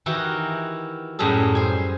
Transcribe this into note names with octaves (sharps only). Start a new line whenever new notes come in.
D#3 E3 E4 F#4 G4 A#4
F#2 A2 G3 G#4 A4
C5 G#5